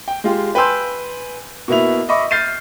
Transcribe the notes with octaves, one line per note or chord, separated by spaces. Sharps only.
G5
G#3 F4 G4
B4 G5 G#5 C6 E6 G6
B2 A#3 B3 E4 E5 F7
D#5 E5 B5 C#6 D6
F6 G6 A6 C7 D#7